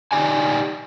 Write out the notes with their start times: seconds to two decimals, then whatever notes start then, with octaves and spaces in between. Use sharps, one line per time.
0.12 D#4 G4 D5 G#5